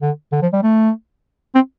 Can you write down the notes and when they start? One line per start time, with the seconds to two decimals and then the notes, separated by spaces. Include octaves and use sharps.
0.02 D3
0.32 D3
0.42 F3
0.53 G3
0.63 A3
1.55 C4